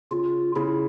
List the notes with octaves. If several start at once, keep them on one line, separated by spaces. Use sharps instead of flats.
C#3 F4
C#3 E4